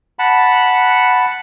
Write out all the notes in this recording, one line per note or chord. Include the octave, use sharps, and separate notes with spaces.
F#5 A5 B5